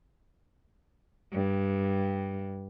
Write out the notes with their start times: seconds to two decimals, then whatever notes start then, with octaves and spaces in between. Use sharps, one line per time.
1.30 G2